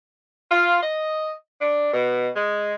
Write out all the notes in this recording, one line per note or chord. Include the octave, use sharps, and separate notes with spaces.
F4
D#5
D4
B2
G#3